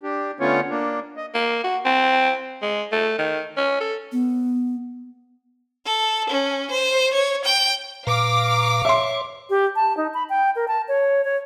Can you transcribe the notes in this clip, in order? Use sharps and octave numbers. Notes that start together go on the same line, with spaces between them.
D4 G4
D3 A3 B3 C#4 F4 C#5
A#3 D4
D#5
A#3
F#4
C4
G#3
A3
D#3
C#4
A4
B3
A4
C#4
C5
C#5
G5
A#2 B4 F5 A#5 D6
C#5 E5 C6
G4
A5
D#4
B5
G5
A#4
A5
C#5
C#5